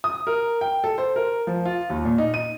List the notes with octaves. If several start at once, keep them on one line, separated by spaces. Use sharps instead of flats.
D#6
A#4
G5
A4
C5
A#4
F3
F4
D#2
A#2
D#4
D#7